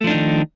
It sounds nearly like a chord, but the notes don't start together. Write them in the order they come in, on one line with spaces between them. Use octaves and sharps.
A3 F3 D4 D#4 D#3